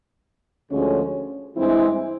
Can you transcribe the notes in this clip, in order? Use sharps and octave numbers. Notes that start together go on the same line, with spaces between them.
D2 D3 F3 G#3 C#4
G2 E3 G#3 C4 E4